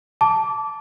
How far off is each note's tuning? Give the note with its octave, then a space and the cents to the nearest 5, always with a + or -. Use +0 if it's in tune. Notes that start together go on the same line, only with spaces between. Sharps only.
A5 +0 D6 -20